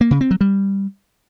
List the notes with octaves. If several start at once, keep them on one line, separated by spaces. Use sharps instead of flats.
A#3
C#3
C4
F#3
G3